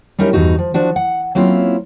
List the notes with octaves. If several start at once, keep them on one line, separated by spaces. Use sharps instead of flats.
G3 C#4 D#4 E4 A#4 E5
E2 G2 D#4 F#4
F3
F3 D4 F#4
F#5
F#3 A#3 C4 C#4 E4 F4